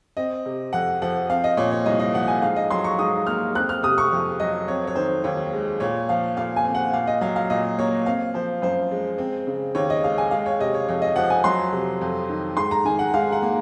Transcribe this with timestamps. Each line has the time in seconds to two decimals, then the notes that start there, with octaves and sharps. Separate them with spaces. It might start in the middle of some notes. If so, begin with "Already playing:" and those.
0.17 C4 D#5
0.46 C3
0.73 F2 F#5
1.02 F3 F#5
1.30 C4 F5
1.44 D#5
1.57 A#2 C#5
1.72 C#5
1.86 C2 D#5
2.00 D#5
2.14 F3 F#5
2.28 G#5
2.42 G#2 F5
2.56 D#5
2.71 F#3 C6
2.84 C#6
2.99 G#2 D#6
3.27 A#3 F6
3.55 C4 F#6
3.69 F6
3.83 C3 D#6
3.98 C#6
4.12 F2
4.40 F#3 D#5
4.68 C4 C#5
4.87 C#5
4.96 D#3 C5
5.24 D#2 C#5
5.53 G#3
5.80 A#2 C#5
6.09 F3 F5
6.37 A#2 F5
6.56 G#5
6.65 C4
6.75 F#5
6.93 A#2 F5
7.07 D#5
7.21 F#3 F5
7.36 F5
7.50 A#2 D#5
7.79 A#3 C#5
8.06 C4 F5
8.34 F3 C5
8.62 F#2 C5
8.91 G#3
9.18 C4
9.47 C#3
9.75 D#2 C#5
9.90 D#5
10.04 G#3 F5
10.18 G#5
10.31 G#3 F5
10.46 C#5
10.59 C3 D#5
10.74 C#5
10.88 F2 C#5
11.02 D#5
11.16 F3 F#5
11.30 G#5
11.44 F#3 C6
11.73 C3
12.01 F2
12.29 D#3
12.57 G#2 C6
12.71 A#5
12.85 D#3 G#5
12.99 F#5
13.14 G#2 F5
13.32 F#5
13.42 A#3